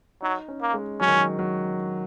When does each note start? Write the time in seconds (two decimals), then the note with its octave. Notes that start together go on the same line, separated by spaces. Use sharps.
0.22 F#3 D#4
0.48 C#4
0.62 A#3
0.74 G#3
1.01 F#3 C#4
1.08 D#3
1.15 F#3
1.39 F#3